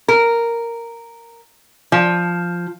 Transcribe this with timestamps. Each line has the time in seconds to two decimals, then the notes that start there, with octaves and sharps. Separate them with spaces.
0.08 A#4
1.92 F3